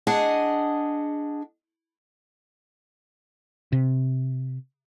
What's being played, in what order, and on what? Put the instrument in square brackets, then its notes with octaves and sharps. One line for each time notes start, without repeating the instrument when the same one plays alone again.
[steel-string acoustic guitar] D4 G#4 D#5 F#5
[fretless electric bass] C3